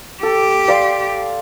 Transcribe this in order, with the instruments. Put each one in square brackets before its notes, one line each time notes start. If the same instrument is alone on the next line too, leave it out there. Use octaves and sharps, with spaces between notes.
[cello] G4 [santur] A4
[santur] D5 F5 C6